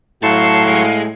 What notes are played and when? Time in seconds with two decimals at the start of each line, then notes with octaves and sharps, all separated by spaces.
0.23 A2 F#3 F5 A5 C6 C#6
0.67 G#3